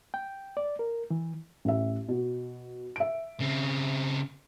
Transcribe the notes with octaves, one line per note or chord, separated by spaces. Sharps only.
G5
D5
A#4
E3
A1 E5
B2
E5 D7
C#3 C4